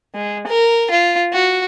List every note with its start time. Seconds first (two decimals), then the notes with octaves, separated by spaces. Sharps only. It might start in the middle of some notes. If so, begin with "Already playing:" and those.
0.15 G#3
0.47 A#4
0.91 F4
1.33 F#4